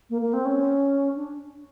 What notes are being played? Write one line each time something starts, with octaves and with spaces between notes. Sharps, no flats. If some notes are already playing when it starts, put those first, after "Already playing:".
A#3
A#3
C4
C#4
D4